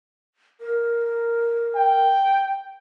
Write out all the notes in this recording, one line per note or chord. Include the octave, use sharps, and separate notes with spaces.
A#4
G5